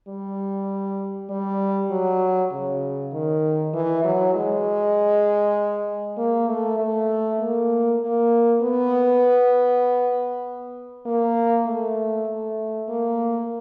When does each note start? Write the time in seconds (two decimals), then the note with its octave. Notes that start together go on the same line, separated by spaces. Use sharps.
0.08 G3
1.30 G3
1.91 F#3
2.52 C#3
3.12 D#3
3.73 E3
4.05 F#3
4.35 G#3
6.17 A#3
6.48 A3
6.79 A3
7.40 A#3
8.01 A#3
8.62 B3
11.06 A#3
11.66 A3
12.28 A3
12.89 A#3